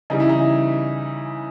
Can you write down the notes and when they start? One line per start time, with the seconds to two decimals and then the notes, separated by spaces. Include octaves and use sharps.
0.10 C#3 E3 G3 D#4
0.20 E4
0.29 D#4